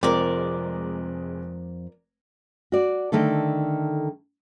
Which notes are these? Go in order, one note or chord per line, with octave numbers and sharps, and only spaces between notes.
F1 F2 G#3 C4 A#4 D5
F#4 D5
D3 D#3 A3 A4